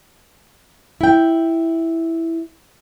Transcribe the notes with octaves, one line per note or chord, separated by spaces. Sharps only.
E4 G5